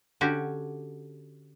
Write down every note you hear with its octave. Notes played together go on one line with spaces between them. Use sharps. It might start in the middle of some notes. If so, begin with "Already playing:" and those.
D3 C#4 F#4 G4